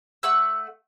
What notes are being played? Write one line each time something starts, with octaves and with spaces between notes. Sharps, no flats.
A3 F#5 E6